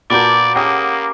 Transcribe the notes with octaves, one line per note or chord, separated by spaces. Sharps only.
A#2 D4 F#4 A#4 B4 D5 D6 G6
G#3 A#3 C#4 G4 F#5 G5 D#6